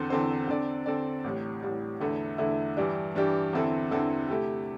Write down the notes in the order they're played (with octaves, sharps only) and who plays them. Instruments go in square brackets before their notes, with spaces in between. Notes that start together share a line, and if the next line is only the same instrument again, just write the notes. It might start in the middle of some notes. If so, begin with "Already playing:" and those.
Already playing: [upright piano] E2 D3 C4 A4 C5
E2 D3 C4 A4 C5
D3 C4 A4 D5
D3 C4 A4 D5
A1 A2 G3
A1 A2 G3
E2 D3 A3 E4
E2 D3 A3 E4
G2 E3 G3 D4 G4
G2 E3 G3 D4 G4
E2 D3 C4 E4 A4
E2 D3 C4 E4 A4
C3 A3 E4 G4